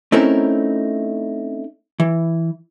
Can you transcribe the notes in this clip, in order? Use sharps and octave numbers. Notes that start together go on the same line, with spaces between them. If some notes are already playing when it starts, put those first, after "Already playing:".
A3 C4 C#4 D#4 E4 A#4
E3